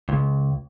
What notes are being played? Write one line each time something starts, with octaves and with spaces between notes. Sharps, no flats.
C#2